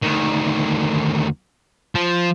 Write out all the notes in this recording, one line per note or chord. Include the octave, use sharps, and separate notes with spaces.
D2 D#3
F3